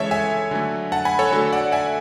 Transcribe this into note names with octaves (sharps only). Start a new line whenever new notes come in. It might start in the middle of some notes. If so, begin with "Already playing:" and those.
Already playing: C#3 E3 G#3 A4 C#5 E5
E5 G#5
D3 F#3 A3
F#5 A5
G#5 B5
A4 C#5
D3 A3 F#4 A4
D5 F#5
E5 G#5